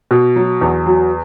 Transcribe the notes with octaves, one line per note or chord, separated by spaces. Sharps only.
B2
F#3
E2
F#3